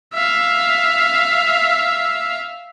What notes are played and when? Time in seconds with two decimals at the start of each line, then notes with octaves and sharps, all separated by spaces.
0.14 E5 F5